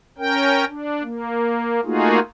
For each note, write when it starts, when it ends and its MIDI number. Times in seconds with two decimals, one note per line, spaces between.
0.18 0.65 61
0.18 0.65 70
0.18 0.65 79
0.67 1.03 62
1.03 1.80 58
1.85 2.20 57
1.85 2.20 58
1.85 2.20 63
1.85 2.20 65
1.85 2.20 66
1.85 2.20 68